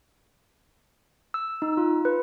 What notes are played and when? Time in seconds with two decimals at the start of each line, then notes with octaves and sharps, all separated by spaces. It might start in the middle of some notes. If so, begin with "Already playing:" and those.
1.34 E6
1.62 D#4
1.77 F4
2.05 B4